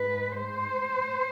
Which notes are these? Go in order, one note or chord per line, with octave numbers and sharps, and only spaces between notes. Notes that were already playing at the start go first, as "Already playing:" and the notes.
Already playing: G#2 G#3 B4
C5